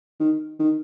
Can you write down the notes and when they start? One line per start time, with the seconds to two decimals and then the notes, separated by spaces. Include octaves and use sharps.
0.20 D#3
0.59 D#3